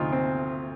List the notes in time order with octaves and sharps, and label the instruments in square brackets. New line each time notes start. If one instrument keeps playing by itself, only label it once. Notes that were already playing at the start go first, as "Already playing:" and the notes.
Already playing: [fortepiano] D2 C3 F3 D#4 F4
C4